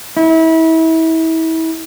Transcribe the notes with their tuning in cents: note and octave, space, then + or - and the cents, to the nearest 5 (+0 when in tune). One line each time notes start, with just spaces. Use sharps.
E4 -30